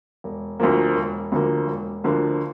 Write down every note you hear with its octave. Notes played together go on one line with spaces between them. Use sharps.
E1
D2 D3 F3 A#3
E1
D2 D3 F3 A#3
E1
D2 D3 F3 A#3